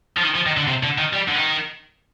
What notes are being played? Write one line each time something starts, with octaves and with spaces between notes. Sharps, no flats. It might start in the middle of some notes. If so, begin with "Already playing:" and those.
F3
D#3
F3
D#3
D3
C3
D3
D#3
G3
D3
D#3